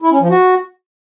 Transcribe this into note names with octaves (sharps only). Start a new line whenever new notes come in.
E4
C#4
F3
F#4